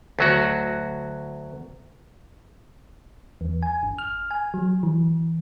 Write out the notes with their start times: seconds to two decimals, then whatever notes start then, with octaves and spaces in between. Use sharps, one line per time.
0.19 D2 F#3 F#4
3.41 E2
3.63 G#5
3.83 G1
3.98 F6
4.31 G#5
4.54 F#3
4.83 E3